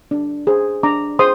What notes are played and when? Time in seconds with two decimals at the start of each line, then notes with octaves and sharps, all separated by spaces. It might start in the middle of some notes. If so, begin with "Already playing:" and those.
0.11 D4
0.47 G#4 C5
0.83 D4 A#5 D6
1.19 G#4 C5 C6 D#6